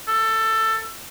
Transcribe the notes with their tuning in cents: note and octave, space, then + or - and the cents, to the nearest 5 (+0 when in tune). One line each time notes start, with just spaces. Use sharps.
A4 +15